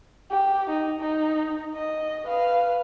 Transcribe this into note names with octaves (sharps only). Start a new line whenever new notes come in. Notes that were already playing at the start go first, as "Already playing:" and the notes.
G4
D#4
D#4
D#5
B4 F5